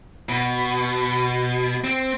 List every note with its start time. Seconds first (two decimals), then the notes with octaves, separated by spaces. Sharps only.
0.29 B2
1.84 C4